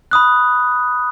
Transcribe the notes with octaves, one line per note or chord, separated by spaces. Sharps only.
B5 D#6 F#6